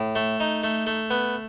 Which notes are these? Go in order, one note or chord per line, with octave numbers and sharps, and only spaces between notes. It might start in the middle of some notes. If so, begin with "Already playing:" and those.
Already playing: A2
A3
D#4
A3
A3
B3